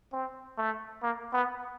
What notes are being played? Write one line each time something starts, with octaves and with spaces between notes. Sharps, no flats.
C4
A3
A#3
B3